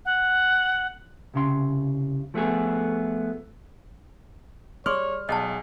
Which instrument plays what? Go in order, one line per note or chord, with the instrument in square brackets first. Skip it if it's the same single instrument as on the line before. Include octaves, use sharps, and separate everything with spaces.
[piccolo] F#5
[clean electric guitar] C2 C#3 C6
F3 A3 B3 G#4
[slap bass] G3 [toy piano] G#4 C6 D#6 [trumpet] C#5 [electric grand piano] F6
[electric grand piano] B1 [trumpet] G#4 [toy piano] D#5 F#5 A5